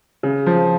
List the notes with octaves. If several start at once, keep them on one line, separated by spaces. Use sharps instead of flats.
C#3
F3